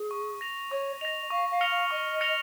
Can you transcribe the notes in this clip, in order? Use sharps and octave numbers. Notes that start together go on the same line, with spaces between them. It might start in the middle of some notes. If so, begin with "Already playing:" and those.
Already playing: G#4
C#6
A#6 F7
C#5 C#6
D#5 A#6 F7
F5 C#6
F5
F6 A#6 C#7 F7
F5
D#5 C#6
F6 A#6 C#7 F7